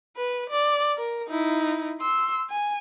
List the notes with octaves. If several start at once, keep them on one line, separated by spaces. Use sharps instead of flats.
B4
D5
A#4
D#4 E4
C6 E6
G#5